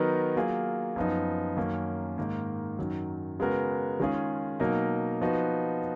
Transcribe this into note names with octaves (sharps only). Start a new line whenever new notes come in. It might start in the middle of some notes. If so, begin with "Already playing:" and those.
Already playing: D#3 F#3 B3 D#4 A#4
F#3 A#3 F4 G#4
F#2 F3 B3 D#4
F#2 D#3 A#3 C#4
G#2 D#3 A#3
F#2 D#3 F#3
C#3 G#3 B3 F#4 A#4
D#3 G#3 C#4 F4 G#4
B2 F#3 A#3 D#4 A#4
F3 B3 D#4 F#4